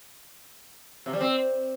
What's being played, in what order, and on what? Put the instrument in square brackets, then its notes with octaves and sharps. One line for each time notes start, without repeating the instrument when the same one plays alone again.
[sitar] C3
G3
C4